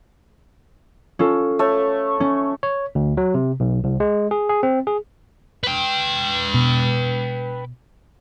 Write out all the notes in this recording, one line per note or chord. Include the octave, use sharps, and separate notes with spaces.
C#4 F4 A4
A3 C#5
C#4
C#5
D2
F#3
C3
B1
C2
G#3
G#4
G#4
C4
G#4
B4 G5
B2